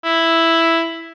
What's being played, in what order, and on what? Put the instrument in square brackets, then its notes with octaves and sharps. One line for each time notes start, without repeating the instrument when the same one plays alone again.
[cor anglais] E4